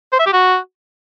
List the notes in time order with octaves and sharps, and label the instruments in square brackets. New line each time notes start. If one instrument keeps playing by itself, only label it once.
[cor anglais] C5
E5
G4
F#4